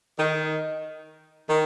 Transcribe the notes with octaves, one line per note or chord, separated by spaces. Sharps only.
D#3
D#3